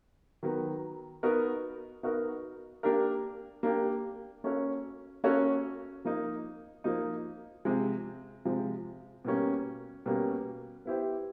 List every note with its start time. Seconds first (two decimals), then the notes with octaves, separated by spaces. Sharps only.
0.43 D#3 F#3 B3
1.23 B3 D#4 F#4 A#4
2.03 B3 D#4 F#4 A#4
2.83 A#3 D4 G4 A#4
3.63 A#3 D4 G4 A#4
4.44 A#3 C#4 F#4 A4 C#5
5.24 A#3 C#4 F#4 A4 C#5
6.04 F3 A#3 D#4
6.84 F3 A#3 D#4
7.65 C3 F3 G#3
8.45 C3 F3 G#3
9.25 B2 G3 A#3 C#4
10.06 B2 G3 A#3 C#4
10.86 B3 E4 G4 C5